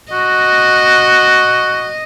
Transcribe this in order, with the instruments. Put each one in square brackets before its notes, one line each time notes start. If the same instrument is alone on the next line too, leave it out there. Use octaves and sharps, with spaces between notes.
[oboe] F#4 [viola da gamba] D#5